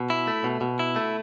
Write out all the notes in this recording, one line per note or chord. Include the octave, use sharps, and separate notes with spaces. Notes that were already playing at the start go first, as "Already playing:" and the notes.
Already playing: B2
E4
A3
B2
B2
E4
A3